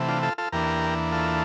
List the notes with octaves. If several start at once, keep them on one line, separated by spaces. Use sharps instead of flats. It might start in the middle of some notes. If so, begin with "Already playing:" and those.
Already playing: C3 E3 A3
D4 F4
F4 A4
F4 A4
E2 E3 A#3 D4 G4 A#4
F4 A4